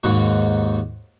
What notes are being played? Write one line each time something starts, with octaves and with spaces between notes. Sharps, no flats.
D#2 G#2 F#4